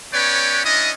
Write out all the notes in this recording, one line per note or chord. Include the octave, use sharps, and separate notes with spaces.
B3 C#4 B4 C#5 D5 G5
C#4 D4 E4 D#5